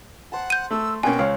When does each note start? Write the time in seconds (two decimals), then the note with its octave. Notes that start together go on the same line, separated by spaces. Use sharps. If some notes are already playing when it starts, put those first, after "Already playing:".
0.32 C5 F#5 A5
0.50 G6 D#7
0.71 A3 E6
1.03 B2 A#3 C#4 G5 G#5
1.19 C#2 C5 C#5 F5